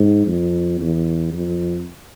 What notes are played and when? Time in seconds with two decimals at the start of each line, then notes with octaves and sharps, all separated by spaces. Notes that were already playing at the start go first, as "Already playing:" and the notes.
Already playing: G#2
0.27 F2
0.80 E2
1.33 F2